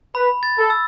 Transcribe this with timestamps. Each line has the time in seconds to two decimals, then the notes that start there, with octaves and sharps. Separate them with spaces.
0.15 B4 B5
0.43 A6
0.57 A4
0.70 E6